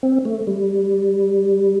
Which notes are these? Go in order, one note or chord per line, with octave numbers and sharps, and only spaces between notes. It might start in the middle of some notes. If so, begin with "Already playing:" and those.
C4
A3
G3